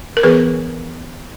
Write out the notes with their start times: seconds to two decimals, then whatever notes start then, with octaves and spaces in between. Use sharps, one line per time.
0.17 A#4
0.23 E3 B3 G#4 B4